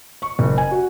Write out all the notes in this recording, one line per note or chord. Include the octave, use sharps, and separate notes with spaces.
C#6
F#1
G#5
F#4